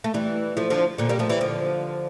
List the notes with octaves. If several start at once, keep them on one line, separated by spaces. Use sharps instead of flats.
A3
E3 G3
F3 A3
D3 F3
A#2 D3
G3 A#3
F3 A3
E3 G3
D3 F3